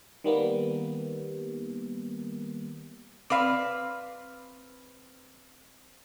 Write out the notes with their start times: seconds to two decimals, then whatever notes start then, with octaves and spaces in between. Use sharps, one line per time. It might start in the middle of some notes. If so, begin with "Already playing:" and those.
0.24 D#3 G3 A#3 B3
3.30 C4 B4 D5 F5 B5 D6